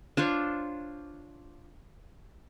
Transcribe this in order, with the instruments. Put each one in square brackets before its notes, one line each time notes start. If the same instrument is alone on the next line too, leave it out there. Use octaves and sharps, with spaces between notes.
[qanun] D4 F4 C5 C#5